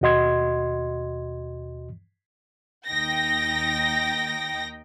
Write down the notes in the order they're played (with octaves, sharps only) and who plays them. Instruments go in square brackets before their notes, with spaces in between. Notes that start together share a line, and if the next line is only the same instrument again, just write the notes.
[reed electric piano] D#2 B2 F#4 D#5 C6 G#6
[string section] D#2 D#4 G5 A#6